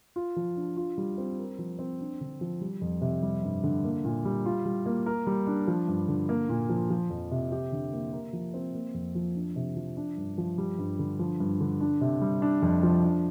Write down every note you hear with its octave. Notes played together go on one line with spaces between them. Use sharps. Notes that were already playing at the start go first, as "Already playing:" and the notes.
F4
F3
D4
F4
G3
C4
A#4
F3
C4
D4
D3
F3
G3
F2
C3
G3
G2
D3
A#3
A#2
G3
F4
G3
A#3
A#4
G3
D4
F3
G2
D3
A#3
A#2
F3
F3
F2
C3
G4
D3
A#3
A#4
F3
C4
A#3
F2
F3
D4
C3
F3
D4
G2
F3
G3
G2
D3
F3
G2
D3
D4
C3
G3
D4
F2
F3
D4